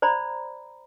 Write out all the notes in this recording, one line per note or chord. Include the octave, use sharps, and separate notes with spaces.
C5 D5 A#5 B5